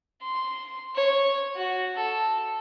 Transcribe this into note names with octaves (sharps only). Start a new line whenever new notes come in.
C6
C#5
F#4
A4